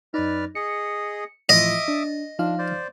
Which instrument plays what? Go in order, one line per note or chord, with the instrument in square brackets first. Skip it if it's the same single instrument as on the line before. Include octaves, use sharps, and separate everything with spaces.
[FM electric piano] F#2 D#4 [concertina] B4 D5 F6
[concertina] G#4 D#5 [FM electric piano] C#7
[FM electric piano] A2 E3 F3 [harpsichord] D#5 [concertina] E5 D6 D#6
[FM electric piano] D4
[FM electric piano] F3 D#4 F5 [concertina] D4
[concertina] C5 D5